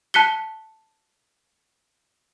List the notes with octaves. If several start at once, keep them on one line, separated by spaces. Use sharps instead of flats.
A5 F#6 B6 C#7 G7